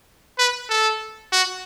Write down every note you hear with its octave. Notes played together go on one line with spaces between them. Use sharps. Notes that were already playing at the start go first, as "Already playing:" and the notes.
B4
A4
F#4